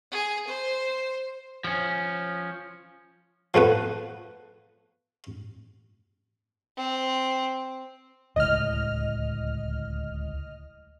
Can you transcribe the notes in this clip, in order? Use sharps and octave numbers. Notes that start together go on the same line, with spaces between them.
G#4
C5
F3 C#4
F3 A3 B3 B4
C4
D1 C#2 A2 D#5 F6